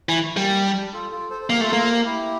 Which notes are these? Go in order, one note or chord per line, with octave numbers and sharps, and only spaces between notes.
E3 A3
A3
G3 A#3
D4
F4 A4
F4 A4
A4 C5
C5
A#3 G4 A#4
A3 F4 A4
A#3 F4 A4
C5
G4 A#4
E4 G4